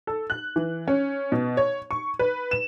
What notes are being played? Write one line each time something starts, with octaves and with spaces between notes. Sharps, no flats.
A4
F#6
E3
C#4
B2
C#5
C#6
B4
E7